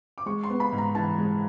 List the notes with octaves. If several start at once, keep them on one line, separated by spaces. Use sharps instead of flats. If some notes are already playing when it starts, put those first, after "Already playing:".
D6
G#3 C#6
C6
B3
B5
G#2
A#5
E3 A5
G#3